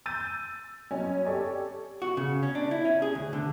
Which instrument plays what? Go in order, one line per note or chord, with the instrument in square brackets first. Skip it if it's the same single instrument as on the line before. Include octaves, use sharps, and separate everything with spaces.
[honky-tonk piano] E6 G6 A6 D#7
F#2 C#4 D#5 G#5
G4 A4 C#5 D5
[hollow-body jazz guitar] F#4
C#3
C#4
D4
E4
C#4
G#4
D2
D3